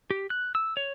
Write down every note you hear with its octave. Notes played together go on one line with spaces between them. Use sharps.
G4
F#6
E6
C#5